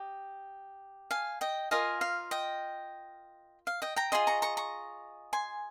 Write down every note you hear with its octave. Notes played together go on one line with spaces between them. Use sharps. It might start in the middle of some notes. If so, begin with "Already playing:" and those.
Already playing: G4 D#5
F5 G#5
D#5 G5
F4 A#4 D#5 F5 G#5
F5
D#5 G5
F5
D#5 G5
G5 A#5
F4 G#4 D#5 G#5 C6
A#5 C#6
A#5 C#6
A#5 C#6
G#5 C6